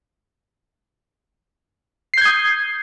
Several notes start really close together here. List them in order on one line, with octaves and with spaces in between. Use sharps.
C7 G6 G#6 D#6